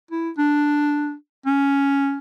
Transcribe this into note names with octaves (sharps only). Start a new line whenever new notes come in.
E4
D4
C#4